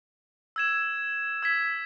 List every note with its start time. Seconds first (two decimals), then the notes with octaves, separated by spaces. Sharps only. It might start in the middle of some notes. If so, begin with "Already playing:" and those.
0.56 E6 G#6 E7
1.43 E6 G#6 B6